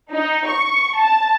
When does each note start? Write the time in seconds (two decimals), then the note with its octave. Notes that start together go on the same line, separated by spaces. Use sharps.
0.12 D#4
0.48 C#6
0.98 A5